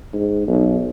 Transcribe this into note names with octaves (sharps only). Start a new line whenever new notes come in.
G#2
B1